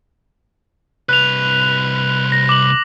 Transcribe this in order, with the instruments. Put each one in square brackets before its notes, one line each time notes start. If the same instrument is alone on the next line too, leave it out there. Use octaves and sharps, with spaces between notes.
[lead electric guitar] C2 B4 [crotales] F#6 F7
[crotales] A#6
D6 F#7